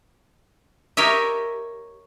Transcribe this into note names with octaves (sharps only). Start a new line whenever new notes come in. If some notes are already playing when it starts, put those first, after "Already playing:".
G4 A#4 C#5 D#5 E5